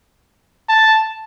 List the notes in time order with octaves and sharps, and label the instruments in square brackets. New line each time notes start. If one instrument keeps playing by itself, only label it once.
[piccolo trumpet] A5